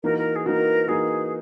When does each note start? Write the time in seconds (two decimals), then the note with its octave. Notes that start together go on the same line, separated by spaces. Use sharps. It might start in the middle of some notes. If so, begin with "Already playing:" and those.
0.03 E3 A#3 D#4 F#4 A#4
0.18 A#4
0.36 G#4
0.46 E3 A#3 D#4 F#4 A#4
0.88 E3 A#3 D#4 F#4 G#4